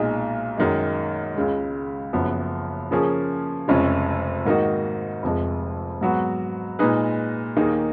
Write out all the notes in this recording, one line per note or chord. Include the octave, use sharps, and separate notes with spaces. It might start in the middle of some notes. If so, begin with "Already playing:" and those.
Already playing: B1 A#2 G#3 D#4 G#4
F#2 D#3 G#3
C#2 C#3 G#3
F#1 F#2 F3 B3
C#3 F3 A#3 C#4 G#4
F1 F2 C#3 G#3 C#4
G#2 D#3 A#3 D#4 F#4
F1 F2 F3 G#3
G#2 F#3 B3 F#4
A#2 G#3 D#4 G#4 B4
D#2 D#3 A#3 D#4 G#4